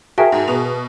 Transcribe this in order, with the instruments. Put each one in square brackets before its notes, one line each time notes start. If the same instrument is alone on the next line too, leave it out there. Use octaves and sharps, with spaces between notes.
[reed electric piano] F#4 G#4 A#4 [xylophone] E5 G5 A5
[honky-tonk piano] G#2
B2 F7